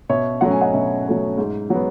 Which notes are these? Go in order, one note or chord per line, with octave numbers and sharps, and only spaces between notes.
B2 C#5 E5
F#3 A3 C#4 F#5
G#5
D#5 F#5
B2 E5 G#5
F#3 A3 C#4
G#2
F#3 B3